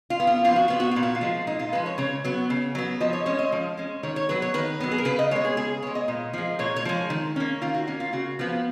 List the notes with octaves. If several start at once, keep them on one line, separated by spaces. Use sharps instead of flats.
F4
B3
F4
F3 F4
F#4
B3 F4
F#4
A#2 F4
F#4
F4
F3 G#3
A#2 D#4
F4
F3 G#3 B4
C#5
C#3 C#5
F#3 B3
C#3
F#3 B3
F3 D#5
C#5
G#3 C#4 C#5
D#5
F3
G#3 C#4
D#3 C#5
C#5
F#3 B3 B4
C#5
D#3 B4
F#3 B3
G#4
A#4
C#3 B4
D#5
G#3 B3 C#5
G#4
C#3 G#4
G#3 B3 C#5
D#5
A#2
F3 G#3
A#2 C#5
C#5
F3 G#3
D#3
A#3 C#4
D#3 F4
F#4
A#3 C#4
F4
C#3 F#4
F3 B3